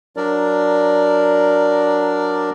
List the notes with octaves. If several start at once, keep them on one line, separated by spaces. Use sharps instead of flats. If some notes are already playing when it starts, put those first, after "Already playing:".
F#3 D4 A#4 D5